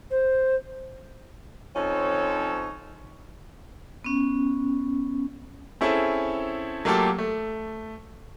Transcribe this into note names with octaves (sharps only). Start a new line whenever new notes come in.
C5
F3 C4 C#4 D#4 A4 C#5
B3 C#4
C4 C#4 E4 G#4 A4
F#3 A3 A#3 F4 G4 A4
A3